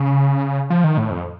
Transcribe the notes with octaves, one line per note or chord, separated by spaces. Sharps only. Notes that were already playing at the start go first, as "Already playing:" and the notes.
Already playing: C#3
F3
D#3
A2
F2